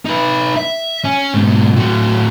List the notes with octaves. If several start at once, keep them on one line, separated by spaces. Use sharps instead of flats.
D#4 B4
E5
C#4
G#2 B2
A2 F#3